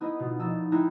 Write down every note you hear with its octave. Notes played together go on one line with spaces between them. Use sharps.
B3 D#4 E4 B4 D#5
B2 F4
A#1 B3 D#4 E6 A6
G#3 D#4 E4 G5 F#6 A#6